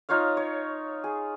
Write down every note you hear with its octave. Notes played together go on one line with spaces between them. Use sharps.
D#4 F4 C#5 F5
C#5
G#4